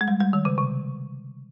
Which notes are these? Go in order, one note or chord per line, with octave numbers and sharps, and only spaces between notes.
G#3
G3
G3
D#3
C#3
C3